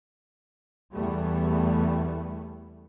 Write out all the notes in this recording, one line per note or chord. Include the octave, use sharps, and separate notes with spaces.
E2 E3 G3 A3 B3